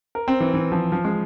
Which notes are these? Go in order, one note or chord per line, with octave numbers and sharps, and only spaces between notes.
A#4
C4
E3
E3
F3
F3
G#3